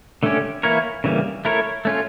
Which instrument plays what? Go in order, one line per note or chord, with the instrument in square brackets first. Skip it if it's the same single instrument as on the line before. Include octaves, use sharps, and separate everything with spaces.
[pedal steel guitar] D3 A3 C#4 G4
E3 A#3 E4 A#4 C#5
C#3 E3 G3 A#3
A3 E4 A#4 C#5
A3 C#4 F4